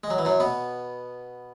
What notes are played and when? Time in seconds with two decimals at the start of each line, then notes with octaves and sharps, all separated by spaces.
0.04 G#3
0.10 F#3
0.18 E3
0.25 F#2 F#3
0.40 B2 B3